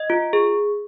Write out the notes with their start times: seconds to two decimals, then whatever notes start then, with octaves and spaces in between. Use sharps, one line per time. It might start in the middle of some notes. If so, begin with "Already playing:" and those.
Already playing: D#5
0.10 F4
0.33 G#4